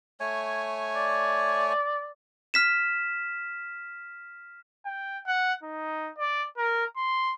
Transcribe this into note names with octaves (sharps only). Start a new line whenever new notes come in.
A3 C#5 G#5
D5
F6 B6 E7
G5
F#5
D#4
D5
A#4
C6